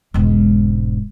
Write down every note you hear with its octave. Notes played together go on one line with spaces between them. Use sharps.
E1 G#2